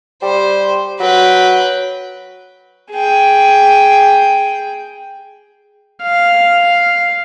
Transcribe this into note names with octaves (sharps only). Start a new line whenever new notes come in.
G3 C5
F#3 B4 G5
G#4 G5
F5